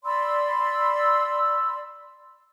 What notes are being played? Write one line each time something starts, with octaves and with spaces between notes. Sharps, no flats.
D5 B5 C6 E6